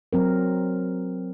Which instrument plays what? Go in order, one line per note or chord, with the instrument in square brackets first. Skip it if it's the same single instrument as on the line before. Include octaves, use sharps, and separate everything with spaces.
[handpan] F#3 C4 A#4